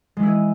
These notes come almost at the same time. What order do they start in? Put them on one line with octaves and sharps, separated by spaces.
G#3 E3 E4 G#4